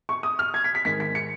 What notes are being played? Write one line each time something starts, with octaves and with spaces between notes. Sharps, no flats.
C#6
D#6
F6
G#6
B6
B6
G#2 D#3 G#3 B6
B6
C#7